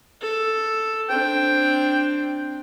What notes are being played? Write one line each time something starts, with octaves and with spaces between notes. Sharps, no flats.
A4
C4 D4 G5